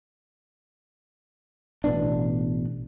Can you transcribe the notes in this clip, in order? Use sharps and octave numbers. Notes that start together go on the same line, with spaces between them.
A1 B2 B3 D4